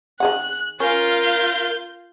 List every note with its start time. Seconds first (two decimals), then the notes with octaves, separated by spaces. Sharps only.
0.20 D#3 G#4 F#5 F#6
0.80 C#4 F4 A#4 F5 G6